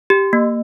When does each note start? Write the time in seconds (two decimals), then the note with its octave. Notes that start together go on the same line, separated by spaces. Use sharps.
0.10 G4
0.33 A#3